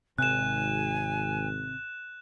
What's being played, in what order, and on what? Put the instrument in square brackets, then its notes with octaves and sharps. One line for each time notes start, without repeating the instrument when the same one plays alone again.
[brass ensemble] G#1 [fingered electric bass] C3 C4 [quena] G#5 [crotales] F#6 E7